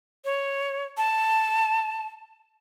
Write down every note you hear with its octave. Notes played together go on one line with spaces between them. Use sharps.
C#5
A5